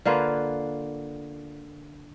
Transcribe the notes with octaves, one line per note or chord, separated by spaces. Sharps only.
D3 A#3 F4 B4